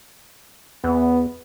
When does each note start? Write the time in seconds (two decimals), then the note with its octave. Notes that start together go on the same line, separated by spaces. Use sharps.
0.84 E2 B3